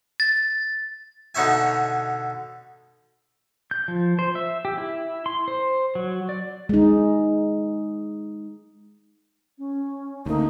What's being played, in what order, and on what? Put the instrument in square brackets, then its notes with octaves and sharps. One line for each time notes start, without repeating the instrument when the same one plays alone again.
[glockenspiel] A6
[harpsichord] B2 D3 D#4 C#5 E5 G#5
[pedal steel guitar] G6
F3
C5
E5
G4
E4
C6
C5
F#3
D5
[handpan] G#3 D#4
[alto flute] C#4
[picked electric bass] D2 [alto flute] A#3 [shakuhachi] D#4